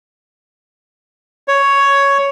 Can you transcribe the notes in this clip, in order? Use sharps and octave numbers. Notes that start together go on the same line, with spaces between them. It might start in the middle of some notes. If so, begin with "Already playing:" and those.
C#5